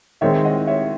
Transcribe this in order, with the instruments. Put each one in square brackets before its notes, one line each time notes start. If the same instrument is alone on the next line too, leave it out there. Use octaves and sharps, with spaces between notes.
[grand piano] D#3 G#3 C4 [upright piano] C#5 E5
[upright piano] D#5 F#5
C#5 E5